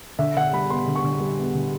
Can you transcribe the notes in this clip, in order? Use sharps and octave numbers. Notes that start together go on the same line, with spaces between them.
D3 E5
D3 F#5
G3 B5
B3 C6
D3
C#6
D3
G3
B3
D3